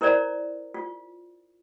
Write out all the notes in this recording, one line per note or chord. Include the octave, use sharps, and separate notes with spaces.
E4 A#4 C5 D5 A#5
F4